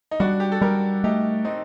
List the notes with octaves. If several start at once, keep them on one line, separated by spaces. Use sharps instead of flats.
D#4
G3 D4 F#4
G4
A4
G3 G4 A#4
A3 D#4 G4
C4 D#4